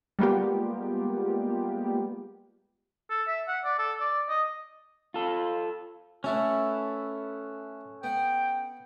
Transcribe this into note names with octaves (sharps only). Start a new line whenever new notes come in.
G3 G#3 A#3 B3 F4 G4
A4
E5
F#5
D5
A4
D5
D#5
F4 A4
A3 C#4 E4 F#4 A4 B4
B3 F#5 G5